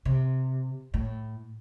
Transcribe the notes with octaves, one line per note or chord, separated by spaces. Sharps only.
C3
A2